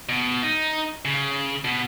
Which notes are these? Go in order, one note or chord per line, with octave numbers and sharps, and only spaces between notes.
B2
D#4
C#3
B2